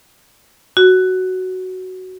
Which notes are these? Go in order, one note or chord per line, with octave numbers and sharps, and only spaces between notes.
F#4